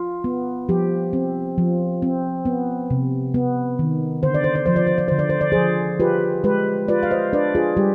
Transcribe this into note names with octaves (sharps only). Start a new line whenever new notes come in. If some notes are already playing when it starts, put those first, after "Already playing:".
Already playing: F4
B3
F3 G4
C4
F3
C4
B3
C3
B3
D#3
D3 C5
D5
C5
D5
F3 C5
D5
C5
D5
D3 C5
D5
C5
D5
F3 G#4 C5
F4 G4 B4
G#3 G4 B4
F4 B4 D5
F5
C5 D#5
D4 B4 D5
F4 G#4
G3 G4